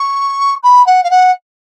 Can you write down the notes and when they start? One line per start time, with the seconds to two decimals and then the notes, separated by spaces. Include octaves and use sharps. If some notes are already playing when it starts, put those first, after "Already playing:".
Already playing: C#6
0.63 B5
0.86 F#5
1.03 F5
1.10 F#5